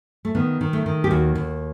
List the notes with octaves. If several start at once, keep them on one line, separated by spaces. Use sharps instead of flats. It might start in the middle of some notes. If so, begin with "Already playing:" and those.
A3
D#3 B3
D#3
A3
D#3
G4
D#2 F#4
D#2